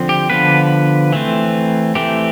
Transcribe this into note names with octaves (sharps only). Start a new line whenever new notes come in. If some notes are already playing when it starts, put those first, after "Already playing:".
Already playing: D3 F3 C4
G4
D3 F3 B3 B4
E3 A3 C4
E3 A3 C4 G4